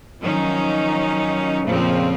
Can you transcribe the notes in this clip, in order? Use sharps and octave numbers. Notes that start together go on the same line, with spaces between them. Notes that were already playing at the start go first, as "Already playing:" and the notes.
D#3 F3 F#3 C#4 D#4
F2 A#2 C#3 F3 C4